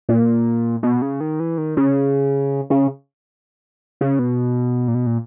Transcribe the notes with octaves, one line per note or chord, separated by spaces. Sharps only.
A#2
B2
C#3
D#3
E3
D#3
C#3
C#3
C#3
B2
A#2
B2
A#2